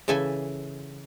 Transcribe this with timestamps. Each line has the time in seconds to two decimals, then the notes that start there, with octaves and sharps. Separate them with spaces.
0.08 C#3 E3 A4 E5 G#5